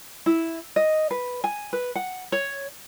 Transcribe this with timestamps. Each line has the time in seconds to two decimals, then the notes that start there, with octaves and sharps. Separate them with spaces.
0.26 E4
0.76 D#5
1.11 B4
1.44 G#5
1.73 B4
1.96 F#5
2.32 C#5